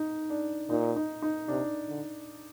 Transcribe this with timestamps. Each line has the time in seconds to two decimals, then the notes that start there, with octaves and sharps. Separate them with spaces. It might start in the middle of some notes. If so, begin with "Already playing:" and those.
Already playing: D#4
0.30 D4
0.70 A#2 D#4
0.96 D#4
1.22 D#4
1.48 C3 D4
1.89 D3